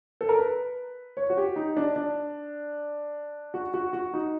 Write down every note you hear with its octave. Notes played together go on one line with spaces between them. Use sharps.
A4
A#4
B4
C#5
F#4
G4
D#4
D4
D4
F#4
F#4
F#4
D#4